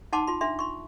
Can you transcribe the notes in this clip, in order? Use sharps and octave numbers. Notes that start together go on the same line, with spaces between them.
D#4 F#5 A5 C6 D6
F4 C6
D4 E5 C6
C6 C#6